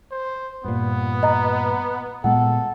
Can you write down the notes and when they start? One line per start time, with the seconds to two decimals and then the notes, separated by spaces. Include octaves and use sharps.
0.11 C5
0.64 G2 A#2 B3
1.23 D#5 A#5
2.24 A#2 G#3 B3 A4 F#5